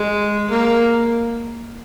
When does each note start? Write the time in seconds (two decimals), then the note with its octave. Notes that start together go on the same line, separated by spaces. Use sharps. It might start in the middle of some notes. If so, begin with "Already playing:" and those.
Already playing: G#3
0.50 A#3